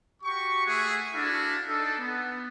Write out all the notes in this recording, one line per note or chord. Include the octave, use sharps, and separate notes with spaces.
F#4 G4 C#6
A3 G#4 E5 F#5
D4 E4 F#4 A4 F5
D4 D#4 A4
B3